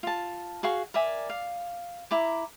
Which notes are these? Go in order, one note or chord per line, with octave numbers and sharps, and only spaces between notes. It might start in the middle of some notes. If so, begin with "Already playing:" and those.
F4 A5
F#4 G#4 F5 C#6
A#4 D5 E5 G#5
F5
E4 A#5 D6